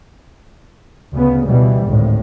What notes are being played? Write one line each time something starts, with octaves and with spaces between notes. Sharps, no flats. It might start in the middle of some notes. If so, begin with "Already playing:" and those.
D2 C#3 B3
B2 E3 G3
G#1 D2 A2